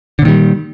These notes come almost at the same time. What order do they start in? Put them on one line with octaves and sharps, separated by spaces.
D3 A#2 D#3 G3